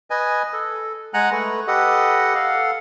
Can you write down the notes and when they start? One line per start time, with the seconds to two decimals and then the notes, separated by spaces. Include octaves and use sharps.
0.10 B4 D#5 G#5
0.53 A4
1.14 G#3 F#5 G#5 A#5 F#6
1.32 A3 B4
1.67 G4 A4 B4 D#5 F#5
2.35 A4 F5 F#5